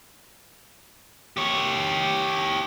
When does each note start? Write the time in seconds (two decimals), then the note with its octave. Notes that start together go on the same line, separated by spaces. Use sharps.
1.37 G4 C#5